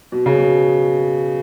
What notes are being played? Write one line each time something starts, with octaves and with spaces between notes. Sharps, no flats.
B2
C#3
B2